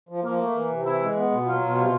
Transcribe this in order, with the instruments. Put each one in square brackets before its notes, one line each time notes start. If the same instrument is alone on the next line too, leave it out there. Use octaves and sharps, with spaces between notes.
[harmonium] F3
[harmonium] F3 [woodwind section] A#3
[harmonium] A3
E3
C3
[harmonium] E3 [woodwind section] E4
[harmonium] G#3
B3
B2
[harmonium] F#3 [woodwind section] F4
[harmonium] B2
C3